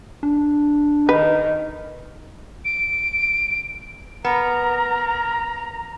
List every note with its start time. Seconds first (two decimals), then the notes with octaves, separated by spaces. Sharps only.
0.23 D4
1.09 D#3 B4
2.65 D7
4.25 B3 A#4 A#5